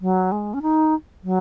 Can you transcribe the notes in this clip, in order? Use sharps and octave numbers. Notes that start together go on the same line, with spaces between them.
F#3
G#3
C#4
D#4
F#3